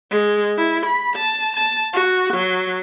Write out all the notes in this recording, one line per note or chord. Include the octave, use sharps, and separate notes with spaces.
G#3
E4
B5
A5
A5
F#4
F#3